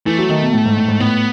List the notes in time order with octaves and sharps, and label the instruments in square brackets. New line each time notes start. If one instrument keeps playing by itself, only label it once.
[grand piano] E3 [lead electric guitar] A3
[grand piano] F#3
D#3
B2
A2
G#2
A2
G#2
[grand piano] A2 [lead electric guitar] B3